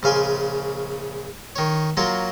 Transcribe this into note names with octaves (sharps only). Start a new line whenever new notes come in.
A#1 C#3 F5 G#5 C6
D#3 C#5
F#3 A#3 F4 C#5 C6